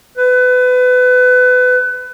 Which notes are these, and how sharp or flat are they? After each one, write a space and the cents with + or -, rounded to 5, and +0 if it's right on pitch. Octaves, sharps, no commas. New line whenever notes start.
B4 +25